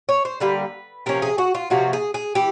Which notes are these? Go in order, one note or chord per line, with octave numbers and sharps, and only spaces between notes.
C#5
C5
D3 G3 A#3 B4
C3 F3 C#4 A#4
G#4
F#4
F4
C3 F3 A#3 C#4 F#4
G#4
G#4
E3 G4